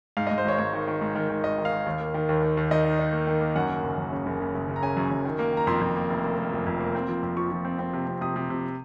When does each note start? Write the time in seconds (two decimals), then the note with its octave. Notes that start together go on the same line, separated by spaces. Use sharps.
0.17 G#2 F5
0.27 G#2 D#5
0.38 C5
0.45 G#1 C#5
0.58 G#2 C#5
0.73 D#3
0.87 D#3
1.01 G#2
1.15 D#3
1.29 D#3
1.44 G#1 D#5
1.58 D#3
1.65 F5
1.72 D#3
1.86 D#2
2.01 A#3
2.14 D#3
2.29 D#2
2.42 D#3
2.57 D#2
2.71 D#3 D#5
2.85 D#4
2.99 D#4
3.13 A#3
3.27 D#3
3.41 A#3
3.56 F#2 F#5
3.69 F#1
3.83 F#1
3.98 F#2
4.12 C#3
4.26 F#1
4.41 C#3
4.55 F#1
4.68 C#3
4.76 A#5
4.82 C#3 G#5
4.97 F#2
5.11 F#2
5.25 D#3
5.39 A#3
5.53 D#3 A#5
5.67 F2 C6
5.81 F2
5.96 A#3
6.10 F1
6.24 A#3
6.38 A#3
6.53 F1
6.67 F2
6.80 A#3
6.95 C4
7.09 F3
7.23 F2
7.37 F3 C#6
7.52 F3
7.65 C4
7.79 C4
7.93 C3
8.07 C3
8.21 C3 D#6
8.36 C3
8.50 C3